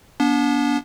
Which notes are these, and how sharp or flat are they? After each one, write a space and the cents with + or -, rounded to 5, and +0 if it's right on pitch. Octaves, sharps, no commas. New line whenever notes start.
B3 -40 D4 -30